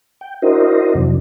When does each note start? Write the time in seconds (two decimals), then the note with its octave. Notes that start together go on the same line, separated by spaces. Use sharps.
0.21 G5
0.42 D4 E4 F#4 A#4 C5 D#5
0.94 F2 C3 E3 F#3 D4